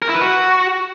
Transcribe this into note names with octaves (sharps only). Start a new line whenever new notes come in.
A#4
E4
B4
F#4